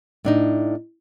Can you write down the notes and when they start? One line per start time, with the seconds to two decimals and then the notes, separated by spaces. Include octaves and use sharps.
0.25 A2 D4 D#4